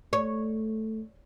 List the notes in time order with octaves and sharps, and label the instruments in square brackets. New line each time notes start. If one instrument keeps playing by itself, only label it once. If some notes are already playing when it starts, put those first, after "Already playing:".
[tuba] A3 [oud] C#5